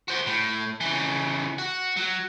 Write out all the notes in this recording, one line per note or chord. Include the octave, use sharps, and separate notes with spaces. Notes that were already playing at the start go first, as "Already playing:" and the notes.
F#4 C5
A2
C#3 E3
F#4
F#3